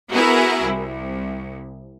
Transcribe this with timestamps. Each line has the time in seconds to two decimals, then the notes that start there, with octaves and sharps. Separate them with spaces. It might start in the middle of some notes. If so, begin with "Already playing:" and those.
0.11 B3 E4 F#4 G#4 A#4
0.67 C2